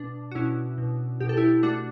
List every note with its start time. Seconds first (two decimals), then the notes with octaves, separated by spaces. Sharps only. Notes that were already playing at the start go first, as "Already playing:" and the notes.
Already playing: B2 D4
0.31 F#4
0.35 B2 C#4 E4
0.78 B2
1.20 B2 G4
1.29 A4
1.37 E4 G4
1.63 A3 D4 F#4